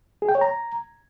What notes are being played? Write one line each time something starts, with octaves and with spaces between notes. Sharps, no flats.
G#4
G5
C#5
A#5